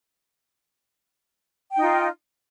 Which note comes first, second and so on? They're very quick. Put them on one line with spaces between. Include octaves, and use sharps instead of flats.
G5 D#4 F4